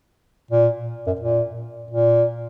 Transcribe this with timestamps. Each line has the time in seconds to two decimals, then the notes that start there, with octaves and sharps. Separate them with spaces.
0.51 A#2
1.06 F#2
1.21 A#2
1.91 A#2